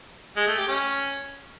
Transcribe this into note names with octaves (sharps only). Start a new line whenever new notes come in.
G#3
A3
G4
C#4